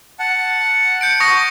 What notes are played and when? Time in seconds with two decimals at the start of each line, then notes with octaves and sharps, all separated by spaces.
0.19 F#5 A5
1.01 G6 C#7 D7
1.20 C#6 D#6 A#6